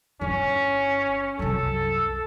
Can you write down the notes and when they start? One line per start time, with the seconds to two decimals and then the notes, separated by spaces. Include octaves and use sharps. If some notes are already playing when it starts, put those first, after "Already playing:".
0.21 G1 C#4 E4
1.39 C2 F#2 A4